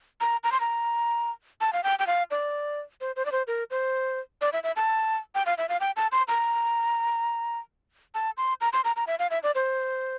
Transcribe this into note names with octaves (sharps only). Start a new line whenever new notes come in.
A#5
A#5
C6
A#5
A5
F5
G5
G5
F5
D5
C5
C5
D5
C5
A#4
C5
D5
E5
E5
A5
G5
F5
E5
F5
G5
A5
C6
A#5
A5
C6
A#5
C6
A#5
A#5
E5
F5
E5
D5
C5